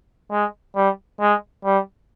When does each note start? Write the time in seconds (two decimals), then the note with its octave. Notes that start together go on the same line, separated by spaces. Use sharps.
0.31 G#3
0.76 G3
1.20 G#3
1.65 G3